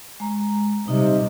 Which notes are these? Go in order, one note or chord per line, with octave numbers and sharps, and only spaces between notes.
G#3 A#5
C3 G3 D#4 D#5